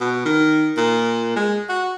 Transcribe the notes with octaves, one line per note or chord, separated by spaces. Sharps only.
B2
D#3
A#2
G#3
F#4